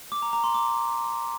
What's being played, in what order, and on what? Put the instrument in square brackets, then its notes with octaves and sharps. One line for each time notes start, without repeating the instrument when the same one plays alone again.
[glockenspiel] D6
A#5
A#5
C6
D6